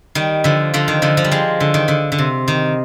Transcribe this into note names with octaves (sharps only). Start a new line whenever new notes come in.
D#3 G3
D3 F3
D3 F3
D#3
D3 F3
F3
G3
F3 G#3
D3
D#3
D3
D3
C3
D#3